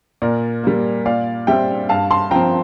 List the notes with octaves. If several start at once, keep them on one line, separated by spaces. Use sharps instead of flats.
A#2 A#4 D5
G3 A#3
A#2 D5 F5
G3 C4 E5 G5
G2 F5 A5
A5 C6
F3 C4 G5 A#5